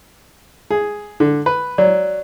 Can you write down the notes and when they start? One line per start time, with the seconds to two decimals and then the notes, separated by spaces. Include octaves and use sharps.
0.71 G#4
1.20 D3
1.46 B4
1.78 F#3 D5